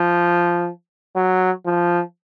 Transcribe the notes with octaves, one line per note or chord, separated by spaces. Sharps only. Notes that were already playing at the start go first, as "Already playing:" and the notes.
Already playing: F3
F#3
F3